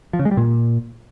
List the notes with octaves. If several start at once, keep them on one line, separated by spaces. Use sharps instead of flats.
F3
C#3
G#3
G3
A#2